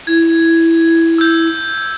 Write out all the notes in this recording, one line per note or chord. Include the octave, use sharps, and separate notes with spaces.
E4 G#6
E6 G6